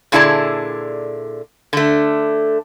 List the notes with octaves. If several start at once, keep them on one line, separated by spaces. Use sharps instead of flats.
A#2 D3 E4 G#4 D5 A5
D3 A3